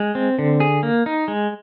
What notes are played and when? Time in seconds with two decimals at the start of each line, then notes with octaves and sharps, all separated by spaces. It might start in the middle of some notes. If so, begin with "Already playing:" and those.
Already playing: G#3
0.15 C4
0.39 D3
0.60 G#4
0.83 A#3
1.06 D#4
1.28 G#3